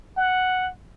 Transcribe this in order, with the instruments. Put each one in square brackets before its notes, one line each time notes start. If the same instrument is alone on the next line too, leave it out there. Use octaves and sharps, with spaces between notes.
[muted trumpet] F#5